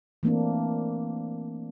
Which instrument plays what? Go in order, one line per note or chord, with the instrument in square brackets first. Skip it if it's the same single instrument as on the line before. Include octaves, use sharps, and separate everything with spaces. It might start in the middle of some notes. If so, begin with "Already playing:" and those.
[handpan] E3 A3 A#3 C4 D4